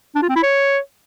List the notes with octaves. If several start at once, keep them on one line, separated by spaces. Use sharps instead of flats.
D4
F4
C4
E4
C#5